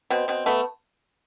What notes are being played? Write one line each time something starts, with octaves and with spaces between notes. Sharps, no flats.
B2 C4
B2 C4
A3 B3